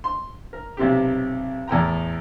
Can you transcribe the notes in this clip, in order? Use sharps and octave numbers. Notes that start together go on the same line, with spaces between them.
C6
A#4
B1 C3 G4
E2 A2 G5 A#5